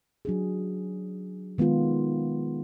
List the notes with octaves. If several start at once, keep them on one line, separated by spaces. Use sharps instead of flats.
F#3 D4 G#4
D#3 G#3 B3 F4